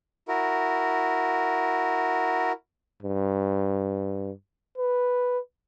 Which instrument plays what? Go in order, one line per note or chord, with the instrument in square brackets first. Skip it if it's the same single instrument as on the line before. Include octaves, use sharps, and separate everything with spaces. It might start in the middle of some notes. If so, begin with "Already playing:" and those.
[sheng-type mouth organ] E4 F#4 A#4
[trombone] G2
B4